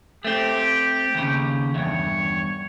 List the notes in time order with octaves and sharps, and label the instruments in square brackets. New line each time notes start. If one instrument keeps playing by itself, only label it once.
[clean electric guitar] A3 C4 [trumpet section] G4
[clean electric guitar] D#2 C#3
[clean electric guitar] E2 G2 [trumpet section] C#5